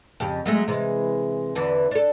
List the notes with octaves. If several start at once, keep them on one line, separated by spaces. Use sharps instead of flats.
F2 C#3 G4
F#3 G#3 A3
C3 E3 G#3
E2 D3 E3
D4 A4